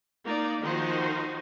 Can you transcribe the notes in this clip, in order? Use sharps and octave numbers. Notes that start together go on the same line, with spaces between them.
A#3 D#4 D5
D#3 F3 D#4 F#4 C5